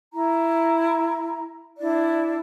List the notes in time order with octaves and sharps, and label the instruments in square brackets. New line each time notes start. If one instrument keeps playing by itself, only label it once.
[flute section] E4 A#5
D4 E4 D5